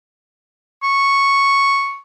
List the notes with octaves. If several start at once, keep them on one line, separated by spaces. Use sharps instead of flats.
C#6